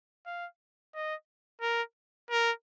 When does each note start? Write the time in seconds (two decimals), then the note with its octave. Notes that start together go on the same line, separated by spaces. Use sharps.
0.26 F5
0.94 D#5
1.61 A#4
2.31 A#4